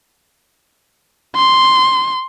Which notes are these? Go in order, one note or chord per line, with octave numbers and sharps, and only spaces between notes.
C6